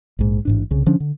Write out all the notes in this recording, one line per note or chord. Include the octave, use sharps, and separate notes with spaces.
A#1 G#2
A1 G#2 D4
C2 C#3
D3 F3 C#4 D4
D3